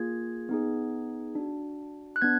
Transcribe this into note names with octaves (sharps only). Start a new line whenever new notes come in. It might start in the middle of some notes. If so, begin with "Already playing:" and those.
Already playing: A#3 F4 G#4 G#6
B3 D#4 G#4
D4 F#4
F#6
B3 D4 G#6